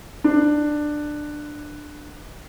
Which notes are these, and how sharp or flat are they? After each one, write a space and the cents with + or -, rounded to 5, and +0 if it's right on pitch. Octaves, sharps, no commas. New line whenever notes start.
D4 +15